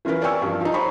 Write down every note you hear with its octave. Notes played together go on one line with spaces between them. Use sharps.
E3 C#4 F4 A#4 B4
A#4 D5 G5 G#5 C#6 E6
G2 F3
F3 D#4
C5 C#5 A#5 B5 C#6